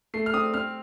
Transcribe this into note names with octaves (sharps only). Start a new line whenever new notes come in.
A3 C7
F6
C4 D#6
C4 F6